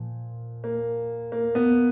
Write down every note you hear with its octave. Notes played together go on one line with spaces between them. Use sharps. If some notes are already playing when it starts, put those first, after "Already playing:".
Already playing: A#2 F3
A#3
A#3
B3